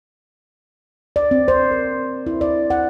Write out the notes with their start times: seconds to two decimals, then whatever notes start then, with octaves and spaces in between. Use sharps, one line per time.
1.16 D5
1.31 C4
1.48 C5
1.71 A#4
2.27 E4
2.41 D5
2.70 F#5